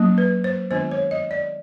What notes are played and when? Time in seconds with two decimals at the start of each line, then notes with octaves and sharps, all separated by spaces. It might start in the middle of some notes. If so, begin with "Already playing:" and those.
Already playing: F#3 A#3 C#4
0.18 B4
0.44 C5
0.70 D#3 G#3 B3 D4 F4 C5
0.91 C#5
1.11 D#5
1.31 D5